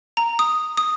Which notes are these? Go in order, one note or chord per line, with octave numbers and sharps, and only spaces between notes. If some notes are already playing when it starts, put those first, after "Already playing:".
A#5
D#6
D#6